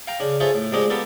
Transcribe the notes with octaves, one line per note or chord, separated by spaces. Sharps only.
F5 G5 A#5
C#3 D4
F4 G#4 A4 C5 C#5 E5
A2
A#2 G#3 C4 D4 G4 D#5
A#3 B3 G4 A4 A#4